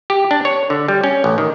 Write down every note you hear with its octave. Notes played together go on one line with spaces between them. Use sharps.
G4
D4
C#5
D3
G3
C#4
A1
D#3